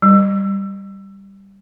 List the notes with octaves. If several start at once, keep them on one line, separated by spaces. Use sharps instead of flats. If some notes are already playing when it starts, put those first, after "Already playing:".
G3